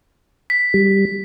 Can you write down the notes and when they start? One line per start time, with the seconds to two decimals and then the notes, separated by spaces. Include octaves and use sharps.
0.50 B6
0.74 G3